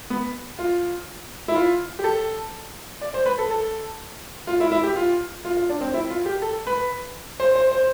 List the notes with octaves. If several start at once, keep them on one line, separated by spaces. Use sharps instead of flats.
B3
F4
E4
F4
G4
A4
D5
C5
B4
A4
A4
F4
E4
E4
G4
F4
F4
F4
D4
C4
E4
F4
G4
A4
B4
C5
C5
C5